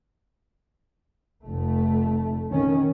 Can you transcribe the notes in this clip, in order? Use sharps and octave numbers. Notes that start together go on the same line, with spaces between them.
F1 A3
D#3 C#4